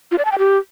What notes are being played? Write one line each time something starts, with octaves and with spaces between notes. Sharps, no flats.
F4
D5
A5
G5
G4